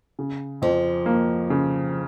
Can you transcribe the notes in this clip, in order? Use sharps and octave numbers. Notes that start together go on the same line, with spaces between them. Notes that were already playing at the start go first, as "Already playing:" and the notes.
C#3
F2 F3
A#3
C#3